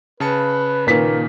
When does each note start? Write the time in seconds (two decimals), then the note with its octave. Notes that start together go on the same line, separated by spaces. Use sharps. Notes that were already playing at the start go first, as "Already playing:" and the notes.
0.20 C#3 B4 A5 C#7
0.87 A#2 D#3 A#3 A#4 B4 B6